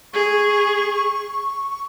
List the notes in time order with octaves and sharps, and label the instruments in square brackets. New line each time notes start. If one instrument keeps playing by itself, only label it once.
[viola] G#4 [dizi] C#6